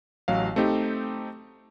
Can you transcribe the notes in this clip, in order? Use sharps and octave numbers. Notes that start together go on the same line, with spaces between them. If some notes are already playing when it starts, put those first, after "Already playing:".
A1 F#3 F5
A3 C4 D#4 G4